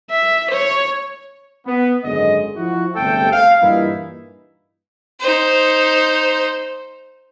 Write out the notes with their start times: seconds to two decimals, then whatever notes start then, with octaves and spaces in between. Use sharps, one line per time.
0.10 E5
0.50 C#5
1.66 B3
2.04 G#1 F#2 D3 G#3 D#5
2.57 F3 E4 F#4
2.95 G1 C#2 C3 A3 A4 G5
3.32 F5
3.62 G2 A#2 E3 A#3 D#4 E4
5.20 D#4 C5